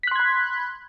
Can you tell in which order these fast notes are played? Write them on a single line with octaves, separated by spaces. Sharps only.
B6 F#6 C6 G#6 B5